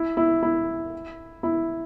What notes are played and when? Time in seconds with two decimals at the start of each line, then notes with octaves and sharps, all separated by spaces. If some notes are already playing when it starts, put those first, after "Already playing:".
Already playing: E4
0.17 E4
0.43 E4
1.43 E4